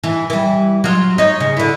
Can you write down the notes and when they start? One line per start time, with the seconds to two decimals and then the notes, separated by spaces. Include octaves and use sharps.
0.04 E3
0.30 E3 G3
0.84 F#3 F4
1.18 D#4 C#5
1.40 C#3
1.57 D3 E4